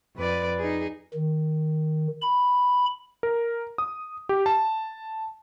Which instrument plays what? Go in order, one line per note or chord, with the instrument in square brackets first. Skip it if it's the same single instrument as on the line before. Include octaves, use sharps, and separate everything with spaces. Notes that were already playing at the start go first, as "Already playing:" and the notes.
[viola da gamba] F2 B4 D5
D#4 G#4
[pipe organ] D#3
B5
[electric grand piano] A#4
D#6
G4
A5